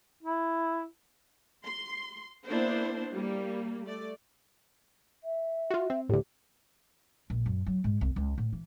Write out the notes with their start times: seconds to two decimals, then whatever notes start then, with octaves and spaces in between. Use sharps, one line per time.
0.23 E4
1.65 C6
2.47 A#3 B3 D4 E4 C5
3.13 G3 A#3
3.85 A3 D5
5.23 E5
5.70 F4 F#4
5.90 C4
6.09 D2 A2 G4
7.30 A#1
7.46 F#2
7.66 F#3
7.84 G#2
8.01 C2
8.16 C#2
8.38 A2
8.53 E3